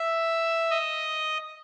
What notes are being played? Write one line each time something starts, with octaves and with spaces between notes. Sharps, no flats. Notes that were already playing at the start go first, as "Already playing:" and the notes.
Already playing: E5
D#5